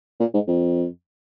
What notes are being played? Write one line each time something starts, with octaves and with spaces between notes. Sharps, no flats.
A#2
G#2
F2